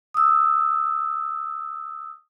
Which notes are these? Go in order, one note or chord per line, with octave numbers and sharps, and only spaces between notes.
D#6 E6